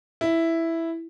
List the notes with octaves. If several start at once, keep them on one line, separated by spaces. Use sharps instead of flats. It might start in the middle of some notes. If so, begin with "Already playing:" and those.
E4